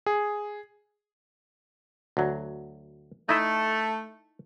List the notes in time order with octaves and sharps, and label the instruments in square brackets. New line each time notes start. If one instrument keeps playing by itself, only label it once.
[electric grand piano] G#4
[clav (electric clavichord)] D2 F#3
[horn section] A3 [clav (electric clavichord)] D#4 E4 E5